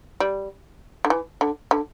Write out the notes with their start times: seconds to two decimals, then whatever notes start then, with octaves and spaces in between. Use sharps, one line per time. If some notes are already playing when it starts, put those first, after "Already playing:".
0.20 G3
1.05 D3
1.10 E3
1.41 D3
1.71 D3